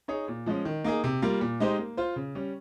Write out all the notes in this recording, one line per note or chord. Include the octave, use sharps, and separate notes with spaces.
D#4 G#4 C#5
A#2
F3 G#3 C#4
D#3
A#3 D#4 G#4
C3
G3 A#3 F4
A#2
G#3 D#4 G4 C5
A#3
F4 C5
C#3
G3 C#4